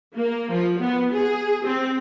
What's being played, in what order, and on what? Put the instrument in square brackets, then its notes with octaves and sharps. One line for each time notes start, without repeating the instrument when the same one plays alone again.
[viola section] A#3
F3
B3
G#4
C4